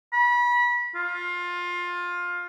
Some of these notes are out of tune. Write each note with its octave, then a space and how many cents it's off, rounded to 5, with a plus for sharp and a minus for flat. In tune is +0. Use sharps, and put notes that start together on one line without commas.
B5 -30
F4 +20